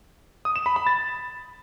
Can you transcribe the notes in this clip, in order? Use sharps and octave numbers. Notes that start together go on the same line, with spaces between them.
D#6
E7
B5
B5
A6